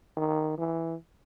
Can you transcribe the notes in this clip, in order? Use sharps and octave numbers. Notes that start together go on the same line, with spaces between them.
D#3
E3